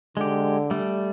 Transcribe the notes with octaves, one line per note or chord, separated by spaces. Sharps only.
D3 G#3 G4
G3 A3